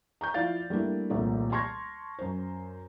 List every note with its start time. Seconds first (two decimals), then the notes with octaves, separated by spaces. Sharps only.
0.21 A#5 C#6 G6
0.34 F3 E4 D5 F5 A6
0.70 G3 A3 A#3 D4 E4
1.10 D#1 C2 A#2 F3 A3
1.52 A5 C6 C#6 F6 G#6 A#6
2.19 F#2 C5